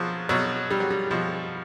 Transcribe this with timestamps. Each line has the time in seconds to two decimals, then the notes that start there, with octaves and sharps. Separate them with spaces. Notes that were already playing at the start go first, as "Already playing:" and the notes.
Already playing: B2 F3 F#3
0.29 B2 F#3
0.71 G3
0.80 F#3
0.90 G3
1.11 B2 F3